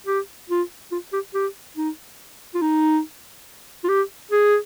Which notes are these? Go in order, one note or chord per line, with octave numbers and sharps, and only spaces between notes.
G4
F4
F4
G4
G4
D#4
F4
D#4
F4
G4
G#4